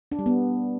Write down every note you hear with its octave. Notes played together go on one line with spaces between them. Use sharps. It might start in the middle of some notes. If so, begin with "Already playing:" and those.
D4
G3
B3